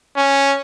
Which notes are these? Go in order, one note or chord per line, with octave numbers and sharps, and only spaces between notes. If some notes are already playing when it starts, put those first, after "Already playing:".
C#4